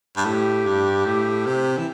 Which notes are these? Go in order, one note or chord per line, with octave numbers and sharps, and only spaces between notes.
G2
A2 G4
G2
A2
C3
E3